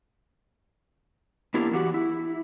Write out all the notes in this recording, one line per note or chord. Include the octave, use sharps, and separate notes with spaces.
A#3 B3 D4 E4 G4 A#4
E2 E3 F#4 G4 F#5
E4